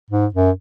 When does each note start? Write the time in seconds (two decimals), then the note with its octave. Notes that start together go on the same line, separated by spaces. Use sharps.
0.10 G#2
0.34 F#2